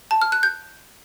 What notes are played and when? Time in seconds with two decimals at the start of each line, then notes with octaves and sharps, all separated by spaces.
0.11 A5
0.22 F6
0.32 F#6
0.43 G6